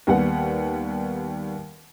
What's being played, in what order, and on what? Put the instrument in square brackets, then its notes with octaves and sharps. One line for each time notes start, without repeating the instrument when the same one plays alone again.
[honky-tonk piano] D#2 G3 B3 F#5